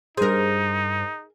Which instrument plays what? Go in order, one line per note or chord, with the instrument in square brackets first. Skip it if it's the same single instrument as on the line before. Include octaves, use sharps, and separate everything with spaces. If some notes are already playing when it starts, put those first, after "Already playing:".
[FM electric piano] G2 C5 [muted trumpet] D#4 [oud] G#4 A#4